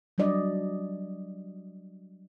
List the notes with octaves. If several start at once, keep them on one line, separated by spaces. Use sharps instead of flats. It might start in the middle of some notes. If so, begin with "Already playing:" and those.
F#3 G3 D4 D5 D#5